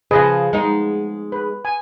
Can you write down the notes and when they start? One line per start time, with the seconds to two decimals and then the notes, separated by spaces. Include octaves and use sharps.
0.11 C#3 F3 F4 G#4 B4 D#5
0.53 G#3 B3 D#4
1.32 B4
1.65 G#5